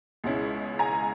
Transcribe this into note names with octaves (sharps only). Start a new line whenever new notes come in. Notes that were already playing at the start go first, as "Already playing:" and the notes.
C#2 B2 G#3 C#4 E4
G#5 A#5